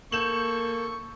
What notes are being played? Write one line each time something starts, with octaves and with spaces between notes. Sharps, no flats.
A#3 A4 C#6 G6 E7 F#7